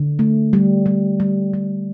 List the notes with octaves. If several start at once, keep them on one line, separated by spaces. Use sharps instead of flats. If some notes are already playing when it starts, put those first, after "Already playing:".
Already playing: D3
A3
G3
G3
G3
G3